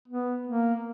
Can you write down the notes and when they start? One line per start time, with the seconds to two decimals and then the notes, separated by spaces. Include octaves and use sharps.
0.08 B3
0.47 A#3